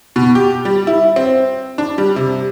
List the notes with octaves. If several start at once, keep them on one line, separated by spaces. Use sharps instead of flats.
B2
G4
G3
E4
C4
D4
G3
C3